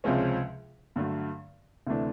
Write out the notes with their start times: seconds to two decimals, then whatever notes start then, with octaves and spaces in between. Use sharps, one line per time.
0.04 C#2 C3 F3 G#3 C#4
0.96 G2 D3 F#3 A3
1.87 D2 C3 E3 A3 D4